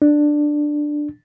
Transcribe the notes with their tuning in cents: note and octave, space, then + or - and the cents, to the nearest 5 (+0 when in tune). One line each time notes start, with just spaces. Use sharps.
D4 +10